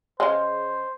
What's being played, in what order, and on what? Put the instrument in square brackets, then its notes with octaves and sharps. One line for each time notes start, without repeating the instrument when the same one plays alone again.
[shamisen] C#3 G#3 [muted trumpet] C5